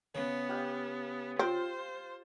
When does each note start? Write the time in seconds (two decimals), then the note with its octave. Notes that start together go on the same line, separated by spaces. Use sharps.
0.15 C#3 B3
0.49 G4 F5 G5
1.39 C4 F4 C5